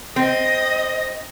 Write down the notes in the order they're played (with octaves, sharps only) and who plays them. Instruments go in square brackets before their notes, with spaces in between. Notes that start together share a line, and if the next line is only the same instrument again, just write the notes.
[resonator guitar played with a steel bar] C4 [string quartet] D#5